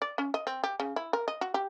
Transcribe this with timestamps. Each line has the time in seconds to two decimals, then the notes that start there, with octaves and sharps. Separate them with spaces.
0.02 D5
0.18 C#4
0.34 D#5
0.47 C4
0.64 G4
0.80 C#3
0.96 E4
1.13 A#4
1.28 D#5
1.41 F#4
1.54 G4